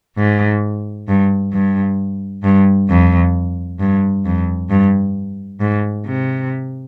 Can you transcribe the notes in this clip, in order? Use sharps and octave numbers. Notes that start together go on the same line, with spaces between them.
G#2
G2
G2
G2
F2
G2
F2
G2
G#2
C3